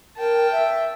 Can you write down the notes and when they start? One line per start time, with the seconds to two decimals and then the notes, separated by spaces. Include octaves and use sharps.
0.17 A#4 G5 A5
0.51 E5